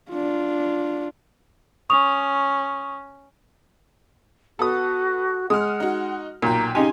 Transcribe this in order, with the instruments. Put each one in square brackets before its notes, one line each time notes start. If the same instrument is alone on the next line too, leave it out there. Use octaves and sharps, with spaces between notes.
[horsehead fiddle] D4 F4
[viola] C#4 [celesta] C#6 D#6 F7
[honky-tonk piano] B3 [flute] F#4 [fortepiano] A4 D#6
[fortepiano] G#3 [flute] F#5 [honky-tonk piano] D#6 F6
[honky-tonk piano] D#4 F#4
[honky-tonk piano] B1 G5 [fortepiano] A#2 [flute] A#5
[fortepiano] C#3 D#4 G4 [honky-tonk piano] G#5 [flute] C6